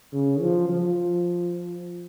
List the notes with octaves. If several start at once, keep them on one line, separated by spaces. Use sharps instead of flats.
C#3
F3
F3